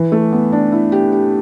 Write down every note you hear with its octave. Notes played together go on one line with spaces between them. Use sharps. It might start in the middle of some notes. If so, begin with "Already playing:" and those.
Already playing: E3
A3
B3
D4
E4
G4
G4